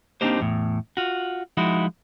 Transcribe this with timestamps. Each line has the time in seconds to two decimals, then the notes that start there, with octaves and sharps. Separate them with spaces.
0.21 A#3 C4 D4 D#4 G4 C5
0.40 E2 A2
0.97 F4 F#4
1.57 F3 G#3 D#4 E4 F#4